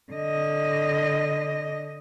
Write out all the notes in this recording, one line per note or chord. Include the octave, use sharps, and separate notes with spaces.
D3 D#5